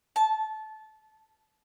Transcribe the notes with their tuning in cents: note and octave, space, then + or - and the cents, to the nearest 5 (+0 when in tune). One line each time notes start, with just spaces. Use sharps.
A5 -20